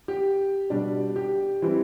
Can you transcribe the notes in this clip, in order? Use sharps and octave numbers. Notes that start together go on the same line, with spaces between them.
G4
B2 G3 D4
G4
E3 G3 C4 E4